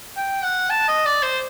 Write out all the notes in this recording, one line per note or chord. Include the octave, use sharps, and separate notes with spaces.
G5
F#5
A5
D#5
D5
C5